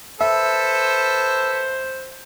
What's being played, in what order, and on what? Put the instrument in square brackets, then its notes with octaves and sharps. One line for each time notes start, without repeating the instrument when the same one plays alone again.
[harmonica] A4 B4 [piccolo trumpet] C5 [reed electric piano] E5